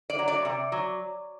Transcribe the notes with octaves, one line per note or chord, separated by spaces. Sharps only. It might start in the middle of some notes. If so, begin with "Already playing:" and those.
D5
F#3
D5
C3
F#3